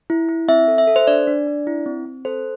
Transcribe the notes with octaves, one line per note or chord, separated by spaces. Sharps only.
E4
E4
C4 E5
A4
E5
A4
C5
D4 D5
D4
D4
E4
C4
C4
A4 C5